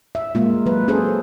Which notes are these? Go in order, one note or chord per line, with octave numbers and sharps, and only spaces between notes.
E5
G#3 A#3 F4
F#3 B4
C#4 G#4 A4 C5